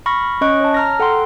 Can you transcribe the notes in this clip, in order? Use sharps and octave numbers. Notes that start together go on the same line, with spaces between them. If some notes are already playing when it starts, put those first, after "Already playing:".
B5 C#6 F6 A#6
C#4 C#5 D#5 C#6 F#6 D7
C#5 A5
A#5 F6 A#6
A4 F#5 G5 C6